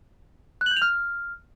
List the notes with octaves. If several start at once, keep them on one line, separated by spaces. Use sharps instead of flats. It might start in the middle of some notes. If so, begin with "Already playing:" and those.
F#6
F#7
G6
F7
F6